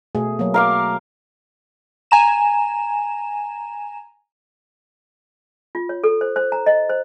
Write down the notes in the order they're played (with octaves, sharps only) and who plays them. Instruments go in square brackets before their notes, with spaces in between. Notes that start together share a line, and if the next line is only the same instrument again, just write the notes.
[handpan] B2 A3 G#4
F#3 A#3
[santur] A#4 F5 D6
[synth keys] G#5 A#5 E7
[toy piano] F4
C#5
A4
C5
C5
A#5
D#5
C5